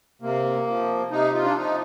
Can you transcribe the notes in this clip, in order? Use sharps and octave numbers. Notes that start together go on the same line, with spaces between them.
C3 A#3
F3
C3 D#4
F4
D4
F3 D#4